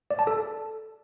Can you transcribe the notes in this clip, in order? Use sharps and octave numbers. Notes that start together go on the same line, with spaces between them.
D5
A5
A4